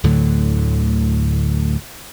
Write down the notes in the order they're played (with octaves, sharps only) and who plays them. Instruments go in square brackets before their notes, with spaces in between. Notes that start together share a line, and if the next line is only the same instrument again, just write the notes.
[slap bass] D2 A2 D3 F#3